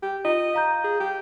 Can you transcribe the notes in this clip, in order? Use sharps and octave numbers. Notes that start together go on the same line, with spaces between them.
G4
F4 D#5
F5 A#5 G6
G#4
G4